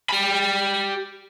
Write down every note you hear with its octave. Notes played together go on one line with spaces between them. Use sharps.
G4 B5